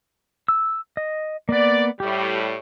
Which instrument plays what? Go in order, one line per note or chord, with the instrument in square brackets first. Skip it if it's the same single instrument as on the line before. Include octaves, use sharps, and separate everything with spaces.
[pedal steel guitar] E6
D#5
[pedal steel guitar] A#3 B3 [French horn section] D5
[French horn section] A2 G3 [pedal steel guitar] G4